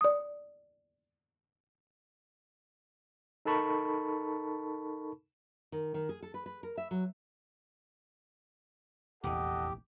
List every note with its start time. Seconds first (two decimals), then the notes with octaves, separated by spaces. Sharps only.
0.01 D5 D#6
3.45 D#4 A4 A#4 A5 B5 C#6
5.72 D#3
5.94 D#3
6.09 G#4
6.23 A4
6.34 B4
6.46 B4
6.63 A#4
6.77 E5
6.91 F#3
9.24 F1 A#1 E2 E3 G4 A4 D#5 F#5